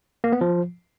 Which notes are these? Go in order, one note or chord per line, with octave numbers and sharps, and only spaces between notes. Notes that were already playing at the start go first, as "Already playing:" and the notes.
A#3
B3
F3